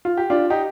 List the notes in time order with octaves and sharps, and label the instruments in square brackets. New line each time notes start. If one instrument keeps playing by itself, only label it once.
[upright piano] F4
G4
D4 F4
D#4 G4